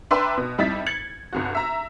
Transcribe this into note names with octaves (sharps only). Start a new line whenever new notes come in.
D4 B4 E5 G5 A#5 C6
B2
F2 G3 D#4 E4 A6 B6
G#6 A6 C#7 F#7
G1 C2 F#4
E5 A#5